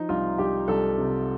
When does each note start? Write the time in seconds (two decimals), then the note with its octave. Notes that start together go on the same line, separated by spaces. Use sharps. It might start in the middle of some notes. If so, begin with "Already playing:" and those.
Already playing: F3 D#4
0.09 C2 F4
0.38 C2 G4
0.68 C2 A4
0.97 C3